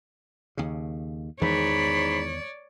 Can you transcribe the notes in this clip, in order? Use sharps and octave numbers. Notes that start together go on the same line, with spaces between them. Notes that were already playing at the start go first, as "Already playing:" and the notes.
D#2 C#3
E2 G#2 D#3 E3 C#5 D5 B5